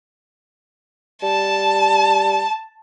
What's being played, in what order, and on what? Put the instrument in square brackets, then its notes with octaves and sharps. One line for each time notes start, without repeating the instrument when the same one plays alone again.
[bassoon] G3 [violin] A5